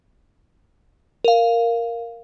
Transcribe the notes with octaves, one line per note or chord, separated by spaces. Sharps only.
A#4 F5